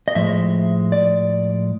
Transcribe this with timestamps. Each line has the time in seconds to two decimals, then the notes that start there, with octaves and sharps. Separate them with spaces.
0.08 D#5
0.15 A2 F3 G#3 E5
0.92 D5